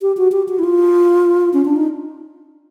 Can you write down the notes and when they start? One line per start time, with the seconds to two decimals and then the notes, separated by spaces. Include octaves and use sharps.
0.02 G4
0.17 F#4
0.32 G4
0.48 F#4
0.59 E4
0.63 F4
1.53 C#4
1.65 D4
1.76 D#4